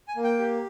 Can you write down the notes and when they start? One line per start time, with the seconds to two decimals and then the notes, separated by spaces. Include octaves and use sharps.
0.08 G#5
0.16 A#3
0.24 G5
0.39 G4